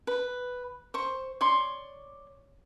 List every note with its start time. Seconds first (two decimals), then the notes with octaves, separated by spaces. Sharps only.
0.07 B4
0.94 C5 C#6
1.41 C#5 D5 C6 C#6